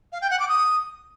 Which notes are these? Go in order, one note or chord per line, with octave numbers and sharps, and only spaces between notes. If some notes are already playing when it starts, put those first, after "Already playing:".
F5
G5
F#5
D6
D#6